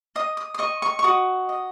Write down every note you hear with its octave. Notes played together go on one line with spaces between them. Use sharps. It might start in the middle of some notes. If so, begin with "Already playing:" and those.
D#5 D#6
D#6
D#6
D#5 C#6
C#6
C#6
F#4 D#6
D#5